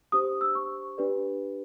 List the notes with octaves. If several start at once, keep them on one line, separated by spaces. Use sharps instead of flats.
D4 G4 C5 D#6
E6
C#6
D4 G4 B4 D5